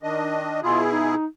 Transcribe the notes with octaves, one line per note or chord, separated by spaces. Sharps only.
D#3 D4 D#5
B2 E4 F4 G#4
D#4